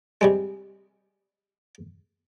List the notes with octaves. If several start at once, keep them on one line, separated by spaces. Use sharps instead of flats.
C3 G3 G#3